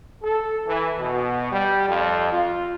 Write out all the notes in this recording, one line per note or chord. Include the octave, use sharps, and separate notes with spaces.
A4
E3
B2
G3
F2
F4